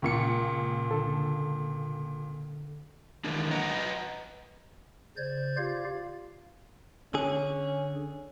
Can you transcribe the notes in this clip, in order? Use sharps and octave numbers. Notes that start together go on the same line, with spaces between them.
C#2 A#2 C#7
D3 A4
D#3 E3 G#3 A#3 D4
B4 D#5 F#5 A#5
C#3 C5 D5 G6 G#6
F4 G4 D5 F5
D3 C#4 G#4